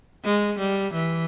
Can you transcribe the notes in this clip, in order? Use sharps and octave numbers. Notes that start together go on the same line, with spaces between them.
G#3
G3
E3